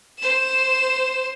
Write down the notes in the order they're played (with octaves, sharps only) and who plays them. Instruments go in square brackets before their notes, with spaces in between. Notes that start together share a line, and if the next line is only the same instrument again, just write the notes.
[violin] C5 E7